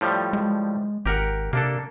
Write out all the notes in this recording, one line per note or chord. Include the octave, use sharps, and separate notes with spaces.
A2 F3 G3
G#3
G#1 G4 A#4 F#5
C3 A#3 D4 A4